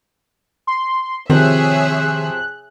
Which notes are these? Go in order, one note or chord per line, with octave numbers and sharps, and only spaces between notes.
C6
C3 D#3 F3 C4 G#4 C#5 E5 F#6